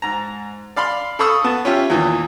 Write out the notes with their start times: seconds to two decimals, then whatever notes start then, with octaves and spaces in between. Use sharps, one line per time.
0.02 G#2 A#5
0.76 D5 F5 B5 C6
1.19 A4 F5 B5 C#6 D#6 E6
1.44 B3 A5
1.65 C#4 F4 G4 E5
1.90 E2 A#2 D#3 E3